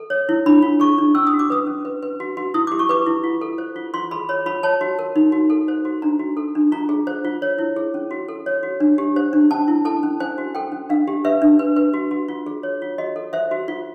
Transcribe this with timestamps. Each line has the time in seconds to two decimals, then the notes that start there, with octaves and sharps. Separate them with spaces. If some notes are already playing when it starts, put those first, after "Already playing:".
Already playing: A4
0.10 C#5
0.29 E4
0.46 D4 B5
0.62 F4
0.80 G#4 C#6
0.98 D4
1.15 C#4 E6
1.27 D#6
1.33 F#4
1.39 D6
1.50 B4 D#6
1.67 C#4
1.85 B4
2.02 B4
2.20 F#4
2.37 F#4
2.54 E4 D#6
2.67 G4 D6
2.79 C#6
2.89 B4 D6
3.07 E4
3.24 F4
3.41 A4
3.58 C5
3.76 F4
3.94 F4 C6
4.11 G#4 B5
4.29 C#5 B5
4.46 F4 B5
4.63 C#5 A5
4.81 F#4
4.99 A#4
5.16 D#4
5.32 F#4
5.50 A4
5.68 C5
5.85 F#4
6.02 D4 A#5
6.19 F#4
6.37 A4
6.55 D4
6.72 F4 A#5
6.89 G#4
7.07 C5
7.25 F4
7.42 C#5
7.59 E4
7.76 G#4
7.94 C#4
8.11 F#4
8.28 A4
8.46 C#5
8.63 F#4
8.80 D4
8.98 G4
9.16 C5
9.33 D4
9.51 C#4 A5
9.68 E4
9.85 A4 A5
10.03 C#4
10.20 C5 G#5
10.38 F#4
10.55 A4 G5
10.72 C#4
10.89 D4 F5
11.08 G4
11.25 B4 E5
11.42 D4
11.59 B4
11.76 B4
11.94 F#4
12.11 F#4
12.28 F4
12.46 G#4
12.63 C#5
12.82 F4
12.98 F#4 D#5
13.16 A4
13.33 C5 E5
13.51 F#4
13.68 F4